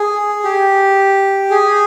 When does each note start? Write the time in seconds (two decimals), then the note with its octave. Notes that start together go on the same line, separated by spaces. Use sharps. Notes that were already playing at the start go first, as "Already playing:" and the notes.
Already playing: G#4
0.44 G4
1.50 G#4